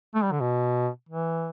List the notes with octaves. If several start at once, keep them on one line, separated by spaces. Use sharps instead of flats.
A3
G3
D3
B2
E3